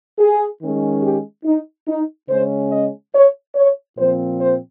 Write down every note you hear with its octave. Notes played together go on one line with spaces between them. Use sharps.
G#4
D#3 G#3 C#4
G4
D#4
D#4
C#3 G#3 C#4 C5
D#5
C#5
C#5
A#2 F3 C4 C5
C5